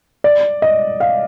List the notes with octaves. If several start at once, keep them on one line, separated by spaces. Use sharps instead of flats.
D5
D#5
F5